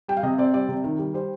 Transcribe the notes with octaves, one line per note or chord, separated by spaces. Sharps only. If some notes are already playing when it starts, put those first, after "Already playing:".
G3 G5
F5
C3 D#5
C4 D5
G3 D5
C3
D#3
G3
G3 C5